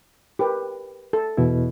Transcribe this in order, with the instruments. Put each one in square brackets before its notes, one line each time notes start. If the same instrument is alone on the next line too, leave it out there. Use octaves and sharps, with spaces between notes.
[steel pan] G4 A#4 B4
A4
[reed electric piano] E2 B2 E4